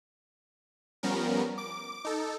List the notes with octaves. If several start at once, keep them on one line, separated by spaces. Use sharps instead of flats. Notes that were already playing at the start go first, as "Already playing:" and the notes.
F3 G3 B3 C#4 A#4
D6
D#4 A4